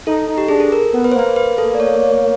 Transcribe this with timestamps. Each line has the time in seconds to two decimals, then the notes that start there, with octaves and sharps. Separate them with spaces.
0.07 D#4 A4
0.29 D#4
0.38 G4
0.48 D4 G#4
0.60 A4
0.72 A#4
0.93 B3
1.04 B4
1.12 C5
1.15 A#3 B4
1.36 B4
1.58 A4
1.75 D5
1.80 C#5
2.00 C#5